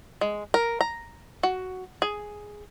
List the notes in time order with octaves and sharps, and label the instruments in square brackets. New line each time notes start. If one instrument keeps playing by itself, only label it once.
[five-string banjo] G#3
A#4
A#5
F#4
G#4